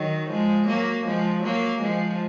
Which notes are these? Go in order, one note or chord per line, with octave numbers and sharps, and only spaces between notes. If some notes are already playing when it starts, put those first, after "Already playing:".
Already playing: D#3 F#3
F3 G#3
F#3 A#3
F3 G#3
F#3 A#3
F3 G#3